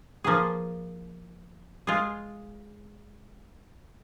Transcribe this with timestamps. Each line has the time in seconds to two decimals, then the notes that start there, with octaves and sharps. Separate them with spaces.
0.24 F3 A#3 G#4
1.87 G#3 F4 G#4